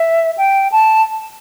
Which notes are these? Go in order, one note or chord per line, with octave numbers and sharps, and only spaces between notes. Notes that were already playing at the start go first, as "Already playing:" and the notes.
Already playing: E5
G5
A5